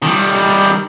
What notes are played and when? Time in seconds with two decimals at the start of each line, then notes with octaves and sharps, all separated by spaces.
0.03 D#3 G3